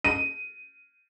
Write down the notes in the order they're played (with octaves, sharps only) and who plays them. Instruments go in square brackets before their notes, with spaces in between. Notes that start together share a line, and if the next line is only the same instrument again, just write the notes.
[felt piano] D#7